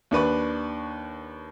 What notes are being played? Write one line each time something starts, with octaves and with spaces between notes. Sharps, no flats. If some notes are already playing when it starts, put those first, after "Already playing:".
D#2 D4 B4 C#6